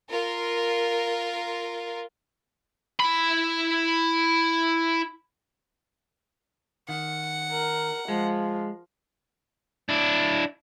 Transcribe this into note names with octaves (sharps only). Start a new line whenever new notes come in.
F4 A#4
E4 B5
D#3 F#5
A#4
F3 G#3
D4 E4